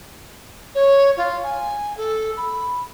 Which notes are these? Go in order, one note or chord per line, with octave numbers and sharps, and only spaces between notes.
C#5
F4
G#5
A4
B5